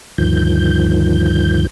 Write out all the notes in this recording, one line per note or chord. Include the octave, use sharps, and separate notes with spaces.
D2 G2 D#3 F3 G6